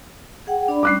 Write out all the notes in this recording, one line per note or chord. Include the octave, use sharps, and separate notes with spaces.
G#4 F#5 G5
D4 D5 B5
G3 C#4 D6 F#6 C7